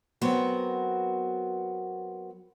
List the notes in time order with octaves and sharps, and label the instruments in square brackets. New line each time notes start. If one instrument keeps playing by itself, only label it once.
[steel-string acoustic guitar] F#3 B3 C4 F#4 A#4